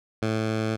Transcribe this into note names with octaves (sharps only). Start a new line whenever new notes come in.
A2